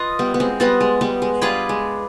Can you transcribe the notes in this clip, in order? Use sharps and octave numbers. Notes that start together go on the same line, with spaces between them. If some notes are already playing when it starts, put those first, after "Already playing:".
Already playing: F4 B4 D#5
G3 B3
B3
G#3 C4
G3 B3 F4 B4 D#5
G#3
G3 B3
G#3
G3 D4 F4 G#4 B4
G#3